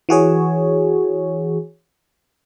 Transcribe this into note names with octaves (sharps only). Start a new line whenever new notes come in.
E3 F#4 G#4 C#5